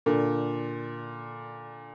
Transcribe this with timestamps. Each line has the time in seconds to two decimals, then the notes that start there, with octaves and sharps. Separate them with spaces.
0.06 A#2 D3